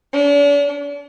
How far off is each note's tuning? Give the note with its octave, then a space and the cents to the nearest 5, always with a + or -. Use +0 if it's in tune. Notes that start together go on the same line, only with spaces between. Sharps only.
D4 -45